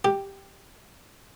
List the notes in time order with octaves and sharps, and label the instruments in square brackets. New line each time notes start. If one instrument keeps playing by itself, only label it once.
[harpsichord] G4